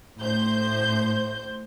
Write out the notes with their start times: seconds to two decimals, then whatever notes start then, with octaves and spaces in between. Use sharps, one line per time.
0.21 A2 C5 G6